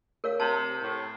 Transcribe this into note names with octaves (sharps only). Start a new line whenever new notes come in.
A#4 C#5 F5
C3 A5
A2